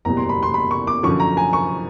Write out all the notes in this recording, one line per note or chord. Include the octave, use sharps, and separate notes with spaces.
F#1 E2 B2 G3 A#5
C6
B5
C6
B5
C#6
D6
F#2 D3 F3 C#6
A#5
G#5
C#6